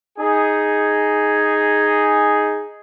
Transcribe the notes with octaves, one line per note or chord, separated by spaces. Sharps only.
D#4 G#4